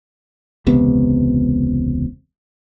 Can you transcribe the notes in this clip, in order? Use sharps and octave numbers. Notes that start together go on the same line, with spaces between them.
E1 C#2 C3 B3